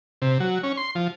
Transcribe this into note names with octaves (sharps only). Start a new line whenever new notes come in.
C3
F#3
C#4
C6
F3